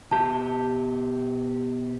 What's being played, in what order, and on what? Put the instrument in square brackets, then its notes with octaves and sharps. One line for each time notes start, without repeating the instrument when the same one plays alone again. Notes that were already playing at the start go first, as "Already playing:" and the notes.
[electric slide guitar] B2 G4 [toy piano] A5